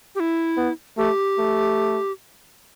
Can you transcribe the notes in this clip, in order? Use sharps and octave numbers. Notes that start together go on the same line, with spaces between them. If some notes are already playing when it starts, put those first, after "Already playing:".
G4
E4
B3
A3 G4
A3